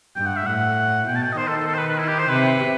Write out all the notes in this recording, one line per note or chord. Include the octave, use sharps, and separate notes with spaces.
G2 G5
F#5
E5
A2 F#5
B2 G5
A5
G5
D#5
D#3 C5
A4
A4
A4
C5
B4
B4
E4
G4
C5
C3 B4